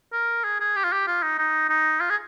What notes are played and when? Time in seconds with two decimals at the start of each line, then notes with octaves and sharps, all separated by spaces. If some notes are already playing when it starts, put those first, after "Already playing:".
0.13 A#4
0.44 G#4
0.60 G#4
0.76 G4
0.84 F4
0.92 G4
1.07 F4
1.23 D#4
1.38 D#4
1.69 D#4
2.00 F4
2.10 G#4